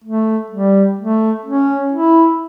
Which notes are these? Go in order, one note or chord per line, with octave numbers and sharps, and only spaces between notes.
A3
G3
A3
C#4
E4